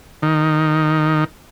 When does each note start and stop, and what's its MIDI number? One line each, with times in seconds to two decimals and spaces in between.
0.22 1.24 51